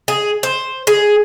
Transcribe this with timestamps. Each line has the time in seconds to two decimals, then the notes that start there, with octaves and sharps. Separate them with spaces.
0.08 G#4
0.43 C5
0.87 G#4